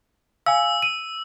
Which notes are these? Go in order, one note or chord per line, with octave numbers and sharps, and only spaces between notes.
F5 G#5 E6
D#7